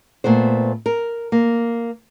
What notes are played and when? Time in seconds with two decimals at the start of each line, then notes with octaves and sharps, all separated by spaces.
0.24 A#2 A3 B3 C5
0.86 A#4
1.32 A#3